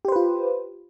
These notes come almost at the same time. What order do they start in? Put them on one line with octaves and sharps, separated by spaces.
G4 C5 B4 F4